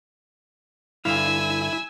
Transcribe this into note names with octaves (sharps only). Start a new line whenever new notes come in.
G2 D3 E4 F5 G#5 E6